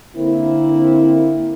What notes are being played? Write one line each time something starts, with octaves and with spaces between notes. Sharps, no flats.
D3 A#3 C4 E4